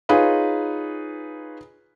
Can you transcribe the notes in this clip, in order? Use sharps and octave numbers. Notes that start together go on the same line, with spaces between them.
D#4 F4 G#4 B4 C#5